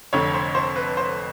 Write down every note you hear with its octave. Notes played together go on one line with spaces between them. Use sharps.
F1 F2 D3 C#5
C5
C5
B4
C5